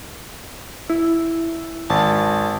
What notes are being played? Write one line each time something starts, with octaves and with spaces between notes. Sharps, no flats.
E4
G#1 A5